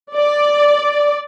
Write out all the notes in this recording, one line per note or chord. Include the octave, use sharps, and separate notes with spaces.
D5